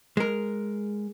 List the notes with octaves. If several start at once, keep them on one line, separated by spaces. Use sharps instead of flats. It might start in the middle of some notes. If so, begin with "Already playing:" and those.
G#3 A#4